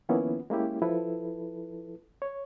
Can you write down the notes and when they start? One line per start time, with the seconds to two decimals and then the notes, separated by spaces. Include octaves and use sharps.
0.09 D#3 F3 A#3 B3 C#4 E4
0.50 G#3 A#3 C#4 E4 G4
0.82 F3 E4 A4 B4
2.22 C#5